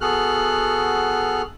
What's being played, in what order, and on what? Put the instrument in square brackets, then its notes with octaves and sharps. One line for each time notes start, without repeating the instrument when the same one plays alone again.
[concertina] B3 F#4 G#4 A4 F6 F#6